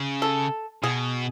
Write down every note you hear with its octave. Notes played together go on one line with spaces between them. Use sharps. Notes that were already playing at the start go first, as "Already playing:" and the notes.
Already playing: C#3
A4
B2 G#4